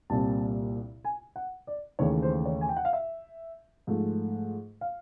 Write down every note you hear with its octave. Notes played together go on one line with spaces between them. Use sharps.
C2 A#2 G3 C4 A5
G#5
F#5
D5
D#2 C#3 E3 A3 C#5
C5
C#5
G#5
G5
F#5
F5
E5
G#2 F3 A3
F5